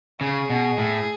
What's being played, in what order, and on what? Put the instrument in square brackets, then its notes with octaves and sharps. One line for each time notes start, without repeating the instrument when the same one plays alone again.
[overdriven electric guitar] C#3 [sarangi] G#4
[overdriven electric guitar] B2
A2